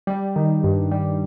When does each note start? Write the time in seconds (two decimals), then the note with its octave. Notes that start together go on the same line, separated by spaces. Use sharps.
0.07 G3
0.36 D#3
0.64 G2
0.91 G3